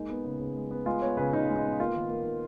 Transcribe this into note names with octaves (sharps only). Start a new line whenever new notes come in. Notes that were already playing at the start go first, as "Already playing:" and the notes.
Already playing: G#3 A#3 D#4
B3
C#3
C#3
G#3
B3
G#3 F4
B3 C#5
C#3 B4
C#3 D#4
G#3
D#4
B3
A#3 F4
D#3
A#3
D#3